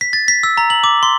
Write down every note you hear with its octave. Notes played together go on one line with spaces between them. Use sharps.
B6
A6
B6
E6
A#5
F#7
D6
C6